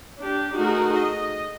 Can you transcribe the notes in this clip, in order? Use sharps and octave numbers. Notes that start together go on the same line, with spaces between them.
D4 G4
A3 D#4 F#4 G#4 A#4
D#5